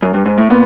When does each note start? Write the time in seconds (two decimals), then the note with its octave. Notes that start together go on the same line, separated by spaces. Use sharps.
0.02 F#2
0.14 G2
0.26 G#2
0.38 A2
0.50 A#2 B3